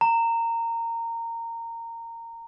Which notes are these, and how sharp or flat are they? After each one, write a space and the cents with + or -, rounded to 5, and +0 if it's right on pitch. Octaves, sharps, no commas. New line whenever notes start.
A#5 -20